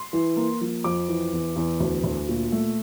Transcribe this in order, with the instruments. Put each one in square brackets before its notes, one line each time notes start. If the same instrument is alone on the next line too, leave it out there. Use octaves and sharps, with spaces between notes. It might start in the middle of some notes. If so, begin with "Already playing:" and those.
Already playing: [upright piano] C6
E3
A#3
F3
F2 D6
E3
E2
E2
D2
D2
A#2
A3